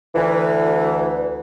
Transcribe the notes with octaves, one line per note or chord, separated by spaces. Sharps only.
D2 E3